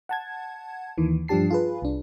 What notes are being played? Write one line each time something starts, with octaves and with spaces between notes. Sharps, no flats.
F#5 A5 G#6
D#2 D#3 E3
G2 F3 D4 G4 A5 C7
F4 G#4 B4
C2 D4